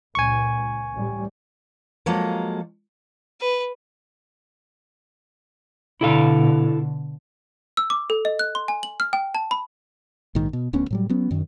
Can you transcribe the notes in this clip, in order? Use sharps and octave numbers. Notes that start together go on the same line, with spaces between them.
C#2 A#2 G#5 C#6
A1 G3
F3 F#3 G#3 A#3 A4
B4
B2 D3 E4 A4 F5
E6
D6
A4
D#5
F#6
C6
G#5
F#7
F6
G5
A5
B5
A#1 G#2 D#3
B2
D1 D2 B3 C#4
A2 F#3 G3
F#3 B3 C#4
F#2 D#3